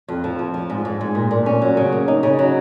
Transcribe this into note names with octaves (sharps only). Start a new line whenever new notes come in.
F2
F3
F2
F3
G#2
G#2
G#2
A#2
A#2
C#4
F#3
C#3
A#3
D#4
C#3
F#3